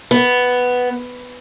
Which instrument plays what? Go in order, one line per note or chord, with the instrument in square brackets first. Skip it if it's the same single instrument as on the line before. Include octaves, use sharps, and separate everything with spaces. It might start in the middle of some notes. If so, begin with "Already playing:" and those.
[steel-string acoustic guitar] B3